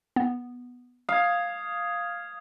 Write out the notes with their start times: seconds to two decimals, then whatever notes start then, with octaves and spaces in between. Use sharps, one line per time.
0.16 B3
1.09 F5 D#6 G#6